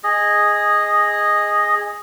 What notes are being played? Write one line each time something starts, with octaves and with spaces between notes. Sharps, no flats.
G#4 D#5